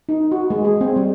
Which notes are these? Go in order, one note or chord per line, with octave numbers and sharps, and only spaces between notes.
D#4
F#4
G#3
G#4
C4
G3